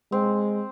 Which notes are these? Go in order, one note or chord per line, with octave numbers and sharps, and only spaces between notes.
G#3 C4